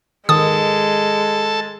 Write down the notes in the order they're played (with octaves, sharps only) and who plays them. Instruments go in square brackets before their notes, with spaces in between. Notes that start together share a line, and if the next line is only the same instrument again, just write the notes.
[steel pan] D#3 [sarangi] G#3 [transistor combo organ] A4 A5 [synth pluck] D#6